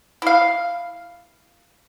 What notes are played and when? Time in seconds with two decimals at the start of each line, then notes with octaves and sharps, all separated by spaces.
0.22 E4 F5